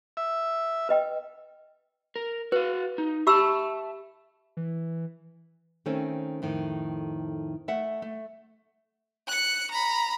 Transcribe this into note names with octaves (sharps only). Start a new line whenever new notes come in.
E5
B4 D#5 G5
A#4
F#4 B4 F5
D#4
G4 E5 A5 B5 E6
E3
D#3 A3 C4 C#4
F2 A2 D#3
A3 E5 F#5
A3
F#6 C#7
A#5 B5